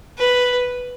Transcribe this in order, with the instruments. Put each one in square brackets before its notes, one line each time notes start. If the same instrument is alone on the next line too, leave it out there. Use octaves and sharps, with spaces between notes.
[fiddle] B4